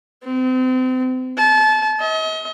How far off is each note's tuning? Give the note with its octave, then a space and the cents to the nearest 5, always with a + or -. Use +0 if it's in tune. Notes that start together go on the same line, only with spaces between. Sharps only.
C4 -35
A5 -30
D#5 +40